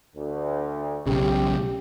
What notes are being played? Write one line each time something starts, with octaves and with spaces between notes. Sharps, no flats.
D2
B1 C#3 G4